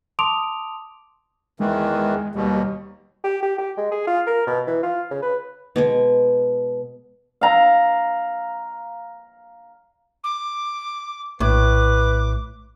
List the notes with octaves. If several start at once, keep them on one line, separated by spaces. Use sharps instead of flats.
A5 C6 D6 D#6 D7 F7
E2 D#3 E3 G#3
D#2 B2 G3
G4
G4
G4
G#3
G#4
F4
A#4
B2
E3
F4
C#3
B4
B2 G#3 G#5
F5 A#5
D6
A#1 A2 B4 D6